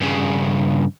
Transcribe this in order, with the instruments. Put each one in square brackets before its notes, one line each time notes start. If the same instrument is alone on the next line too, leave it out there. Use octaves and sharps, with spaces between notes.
[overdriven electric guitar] G2 C#3